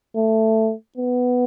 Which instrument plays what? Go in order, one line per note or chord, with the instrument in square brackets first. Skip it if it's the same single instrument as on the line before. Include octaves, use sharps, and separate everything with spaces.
[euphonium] A3
B3